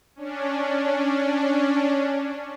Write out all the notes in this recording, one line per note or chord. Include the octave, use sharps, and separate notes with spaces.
C#4 D4